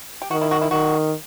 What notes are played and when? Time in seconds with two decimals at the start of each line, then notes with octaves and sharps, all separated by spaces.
0.22 G4
0.31 D#3 F#4
0.41 E4
0.51 F#4
0.61 E4
0.71 D#3 F#4